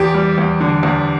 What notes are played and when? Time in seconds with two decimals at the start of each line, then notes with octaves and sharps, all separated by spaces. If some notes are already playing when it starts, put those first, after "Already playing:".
Already playing: E2 G4
0.14 G3
0.38 E2
0.61 D3
0.83 E2